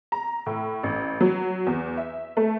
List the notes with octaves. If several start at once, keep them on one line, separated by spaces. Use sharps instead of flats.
A#5
A2
A1
F#3
E2
E5
A3